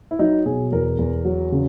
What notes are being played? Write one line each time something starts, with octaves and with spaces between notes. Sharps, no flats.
E4
F#3 D#4
B2 G#4
E2 A#4
E2
F#3
C#3